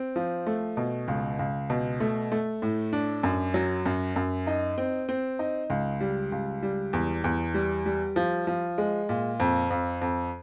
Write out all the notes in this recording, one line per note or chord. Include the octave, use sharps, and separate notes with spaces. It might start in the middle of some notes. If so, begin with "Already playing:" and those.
Already playing: C4
F3
A3
B2
C#2
C#2
B2
A3
A3
A2
D4
F#2
F#3
F#2
F#2
D#4
C4
C4
D#4
C#2
G3
C#2
G3
E2
E2
G3
G3
F3
F3
G#3
A#2
F2
F2
F2